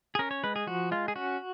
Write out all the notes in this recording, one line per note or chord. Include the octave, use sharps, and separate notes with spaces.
G#4
C#4 A#4
C#5
G#3 B4
G#4
F3 F#4
G#3 F4
G#4
C#4 F#4